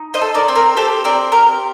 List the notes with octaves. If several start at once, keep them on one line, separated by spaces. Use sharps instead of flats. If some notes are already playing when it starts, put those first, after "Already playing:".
Already playing: D#4
C5 D#5
A4
A#4 D5
C4
A#4
G4 A4 C5
C4 A#4 D5
G4 A#4